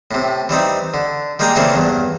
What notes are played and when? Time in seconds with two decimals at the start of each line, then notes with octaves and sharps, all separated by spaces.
0.11 A2 C3
0.49 E3 G3 C4 D#4
0.94 D3
1.39 G3 G#3 A#3 G5 G#5 A#5
1.55 C#3 E3 A3 A#3 C4 D4
1.74 E2 G2